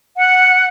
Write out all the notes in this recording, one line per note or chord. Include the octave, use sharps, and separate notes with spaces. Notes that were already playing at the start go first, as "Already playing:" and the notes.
F#5